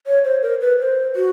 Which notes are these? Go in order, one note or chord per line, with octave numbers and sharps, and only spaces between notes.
C#5
C5
A#4
B4
C5
F#4